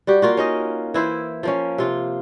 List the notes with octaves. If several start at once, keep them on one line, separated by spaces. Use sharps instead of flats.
G3 F#4 G4
A#3 F4 F#4
C#4 D#4 D#5
E3 E4 C5
F3 A#3 C#4
C3 F4